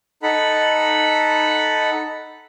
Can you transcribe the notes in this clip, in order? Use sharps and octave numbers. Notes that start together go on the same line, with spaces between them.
D#4 A4 F#5 B5